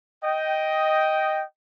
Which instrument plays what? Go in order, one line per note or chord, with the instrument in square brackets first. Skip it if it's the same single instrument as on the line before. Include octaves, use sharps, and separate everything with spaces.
[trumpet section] D#5 G5